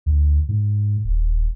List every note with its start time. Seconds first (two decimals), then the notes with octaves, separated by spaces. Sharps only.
0.06 D2
0.49 G#2
1.04 D#1